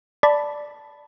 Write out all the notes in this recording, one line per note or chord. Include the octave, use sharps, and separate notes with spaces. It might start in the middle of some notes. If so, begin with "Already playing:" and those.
D5 A5 B5